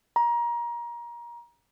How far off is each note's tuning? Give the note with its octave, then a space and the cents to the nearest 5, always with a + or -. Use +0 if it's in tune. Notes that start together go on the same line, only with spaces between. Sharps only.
A#5 +25